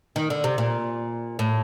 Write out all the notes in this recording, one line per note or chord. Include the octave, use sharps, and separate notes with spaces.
D#3
D3
C3
A#2
A2